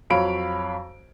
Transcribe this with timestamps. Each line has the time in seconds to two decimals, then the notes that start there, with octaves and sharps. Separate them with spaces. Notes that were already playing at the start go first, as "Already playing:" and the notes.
0.10 F2 F#3 C#5 F5 B5 D7